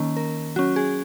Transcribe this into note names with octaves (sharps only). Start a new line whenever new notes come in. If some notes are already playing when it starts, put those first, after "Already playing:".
Already playing: D#3 A#3 C#4
A#4
F#3 C#4 F#4
G#4